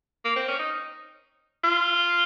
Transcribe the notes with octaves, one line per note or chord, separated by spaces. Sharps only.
A#3
C4
C#4
D#4
F4